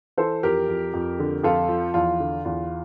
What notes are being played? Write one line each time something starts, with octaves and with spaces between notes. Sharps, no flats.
E3 A4 C5
F2 G4 A#4
F2
F2
D3
F2 F4 A4
F3
E2 F4
D3
E2 F4